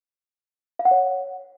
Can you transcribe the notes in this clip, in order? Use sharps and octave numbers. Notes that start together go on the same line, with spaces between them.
F5
F#5
C#5